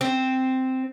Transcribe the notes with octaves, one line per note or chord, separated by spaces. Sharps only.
C4